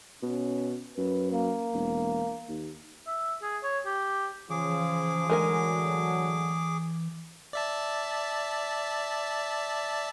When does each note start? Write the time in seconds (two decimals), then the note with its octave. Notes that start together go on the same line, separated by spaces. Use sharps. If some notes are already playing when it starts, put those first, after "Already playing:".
0.22 B2 C#4
0.97 F#2 B4
1.32 A#3
1.73 E1
2.48 D#2
3.07 E5
3.42 G#4
3.63 C#5
3.85 G4
4.50 C#3 E3 F3 G#4 D6
5.30 A2 D3 F#3 G#3 A#4 G#5
7.53 D5 E5 A5